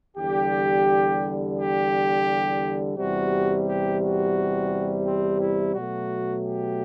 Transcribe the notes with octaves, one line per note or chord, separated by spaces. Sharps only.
E2 D3 G3 G4
G4
E2 C3 G3 F#4
G4
F#4
C4
E4
B2 F#3 A3 F#4
G4